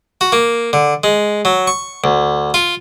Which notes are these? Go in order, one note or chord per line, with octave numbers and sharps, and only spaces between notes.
F#4
A#3
D3
G#3
F#3
C#6
D2
F4